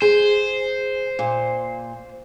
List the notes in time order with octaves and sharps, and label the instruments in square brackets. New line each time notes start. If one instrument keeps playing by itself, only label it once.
[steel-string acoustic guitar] G#4 [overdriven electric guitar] C5
[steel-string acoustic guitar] A#2